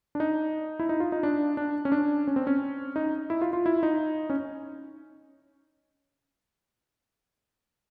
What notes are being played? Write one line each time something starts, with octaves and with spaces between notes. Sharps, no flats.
D4
D#4
E4
D#4
F4
D#4
D4
D4
C#4
D4
C#4
C4
C#4
D#4
E4
F4
F4
E4
D#4
C#4